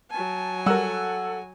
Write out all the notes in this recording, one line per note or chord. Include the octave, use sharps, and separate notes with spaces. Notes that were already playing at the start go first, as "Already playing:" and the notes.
F#3 G#5 A5
G3 A4 A#4 F#5 E6